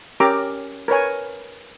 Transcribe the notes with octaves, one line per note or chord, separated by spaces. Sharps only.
C#4 G4 A#4 A#5 D6 E6
A#4 B4 C#5 G#5